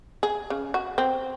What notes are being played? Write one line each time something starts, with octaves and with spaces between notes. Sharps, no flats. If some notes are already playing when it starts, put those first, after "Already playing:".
G#4
C#3
F#4
C4